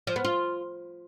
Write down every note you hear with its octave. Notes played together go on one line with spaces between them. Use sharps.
F3
B3
F4